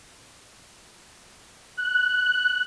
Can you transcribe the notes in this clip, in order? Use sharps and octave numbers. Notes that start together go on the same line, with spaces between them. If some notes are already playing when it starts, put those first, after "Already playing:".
F#6